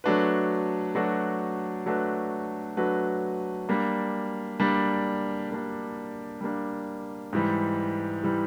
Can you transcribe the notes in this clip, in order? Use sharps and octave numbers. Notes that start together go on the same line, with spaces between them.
F#3 A3 D4 F#4 B4
F#3 A3 D4 F#4 B4
F#3 A3 D4 F#4 B4
F#3 A3 D4 F#4 B4
G3 A#3 D4
G3 A#3 D4
G3 A#3 D4
G3 A#3 D4
G#2 E3 G3
E3 G3